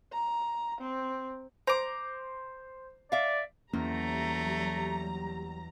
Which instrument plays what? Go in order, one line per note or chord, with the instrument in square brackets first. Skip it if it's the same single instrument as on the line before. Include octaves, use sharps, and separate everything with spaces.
[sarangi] A#5
C4
[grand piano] C5 [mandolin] A#5 D6
[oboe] D5 [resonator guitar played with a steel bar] E5 F5
[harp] E2 [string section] F#3 G3 A#5 [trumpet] A3 [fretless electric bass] A#3 C#4